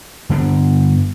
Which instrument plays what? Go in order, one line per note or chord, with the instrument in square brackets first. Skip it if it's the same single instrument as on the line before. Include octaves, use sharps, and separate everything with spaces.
[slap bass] G2 D3 B3 D4